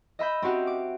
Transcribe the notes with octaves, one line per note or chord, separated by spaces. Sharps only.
D#5 E5 B5 G6
C4 C#4 F#4 G4
D6